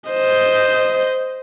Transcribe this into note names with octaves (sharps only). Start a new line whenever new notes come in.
C5 D#5